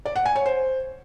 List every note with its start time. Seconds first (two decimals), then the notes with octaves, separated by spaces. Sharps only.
0.05 D5
0.16 F#5
0.26 G#5
0.36 C#5
0.46 C5